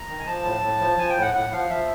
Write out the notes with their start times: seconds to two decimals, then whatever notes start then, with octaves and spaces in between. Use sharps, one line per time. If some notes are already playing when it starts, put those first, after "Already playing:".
Already playing: A#5
0.09 D#3
0.20 G#5
0.26 F3 A5
0.44 A2
0.63 A2
0.80 F3
0.97 F3 G#5
1.10 G5
1.16 A2
1.22 F#5
1.34 A2 F#5
1.52 F3 F5
1.69 F3 E5